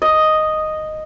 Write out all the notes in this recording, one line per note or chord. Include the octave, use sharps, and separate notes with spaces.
D#5